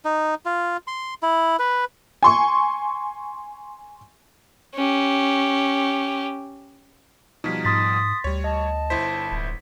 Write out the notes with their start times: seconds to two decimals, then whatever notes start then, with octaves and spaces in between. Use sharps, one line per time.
0.05 D#4
0.45 F4
0.87 C6
1.23 E4
1.59 B4
2.23 G#5 C6 C#6
4.75 C#4 G4
7.44 B2 F3 G3 D#4 B6
7.65 G#2 C6 D#6 A6 B6
8.24 D2 G3 C#5
8.44 D#5 A5
8.90 G1 E4 C5 B6
9.31 D1